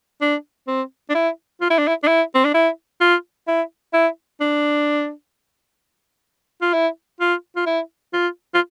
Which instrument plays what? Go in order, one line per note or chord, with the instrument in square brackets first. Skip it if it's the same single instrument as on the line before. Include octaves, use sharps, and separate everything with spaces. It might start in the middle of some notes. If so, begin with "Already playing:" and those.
[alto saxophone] D4
C4
D4
E4
F4
E4
D4
E4
D4
E4
C4
D4
E4
F4
E4
E4
D4
F4
E4
F4
F4
E4
F4
F4